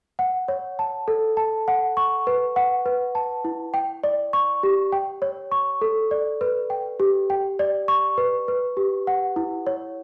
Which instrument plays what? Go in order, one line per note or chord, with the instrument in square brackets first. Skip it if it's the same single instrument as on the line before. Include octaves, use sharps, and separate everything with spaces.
[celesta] F#5
C#5
A5
A4
A5
F#5
C#6
B4
F#5
B4
A5
E4
G5
D5
C#6
G4
G5
C#5
C#6
A4
D5
B4
G5
G4
G5
D5
C#6
B4
B4
G4
F#5
E4
C#5